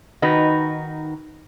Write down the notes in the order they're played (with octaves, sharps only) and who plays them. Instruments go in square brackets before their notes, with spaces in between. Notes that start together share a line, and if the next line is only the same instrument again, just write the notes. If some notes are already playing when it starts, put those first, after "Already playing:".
[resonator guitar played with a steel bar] D#3 D#4 F#4 B4